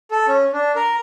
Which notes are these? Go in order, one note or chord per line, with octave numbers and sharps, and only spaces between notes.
A4
C#4
D4
A#4